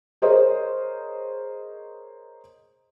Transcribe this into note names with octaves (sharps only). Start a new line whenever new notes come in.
G#4 A#4 C5 C#5 D#5